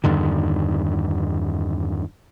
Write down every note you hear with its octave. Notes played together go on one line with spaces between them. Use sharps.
E2 G2 D3 D#3